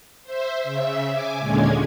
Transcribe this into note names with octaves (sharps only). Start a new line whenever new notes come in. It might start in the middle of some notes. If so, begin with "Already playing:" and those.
C5 E5
C#3 E5
G#5 D6
D#2 A#2 D3 G#3 C#4 G#6